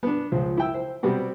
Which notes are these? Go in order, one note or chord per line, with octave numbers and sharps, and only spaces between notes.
B3 D4
C#2 F3 C5
E4 G5 E6
C5
C3 G3 B3 C4 F#4